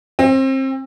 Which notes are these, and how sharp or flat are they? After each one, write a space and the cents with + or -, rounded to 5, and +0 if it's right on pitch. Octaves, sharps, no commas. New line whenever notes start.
C4 +30